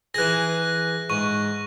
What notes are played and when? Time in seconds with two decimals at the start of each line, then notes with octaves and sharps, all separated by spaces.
0.14 E3 G#4 F#6 A#6
1.10 G#2 C#6